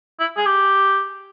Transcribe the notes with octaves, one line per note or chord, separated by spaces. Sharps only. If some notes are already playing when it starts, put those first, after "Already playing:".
E4
G#4
G4